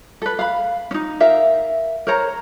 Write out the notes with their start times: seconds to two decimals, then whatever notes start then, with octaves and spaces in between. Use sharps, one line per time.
0.22 A4 B4
0.39 F5 B5
0.91 C#4 D#4
1.20 A#4 E5 F5
2.07 A#4 C5 C#5 A#5